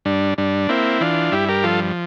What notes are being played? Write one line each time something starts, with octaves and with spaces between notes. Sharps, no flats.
G2 D4
G2 D4
A#3 C4 E4
E3 D4 F4
G2 E4 G4
G4 A#4
F3 F4 A4